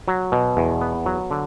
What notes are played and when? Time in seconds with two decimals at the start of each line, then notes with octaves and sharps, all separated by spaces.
0.08 F#3
0.32 B2
0.57 E2
0.81 B3
1.06 F#3
1.31 D3